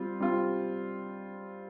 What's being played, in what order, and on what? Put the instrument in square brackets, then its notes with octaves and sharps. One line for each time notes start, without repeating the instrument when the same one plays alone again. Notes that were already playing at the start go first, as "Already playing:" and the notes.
Already playing: [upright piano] G3 C4 F4
G3 C4 F4